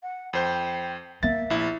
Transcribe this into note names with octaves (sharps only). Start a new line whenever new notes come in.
F#5
F2 C5 G5 G6
A#3 E5 A6
A#1 E4